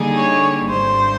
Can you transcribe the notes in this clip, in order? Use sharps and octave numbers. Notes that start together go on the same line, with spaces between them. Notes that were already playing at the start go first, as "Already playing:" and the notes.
Already playing: D3 G3 A#3 D#4 G#4
C#5
G#1 G2 D3 C5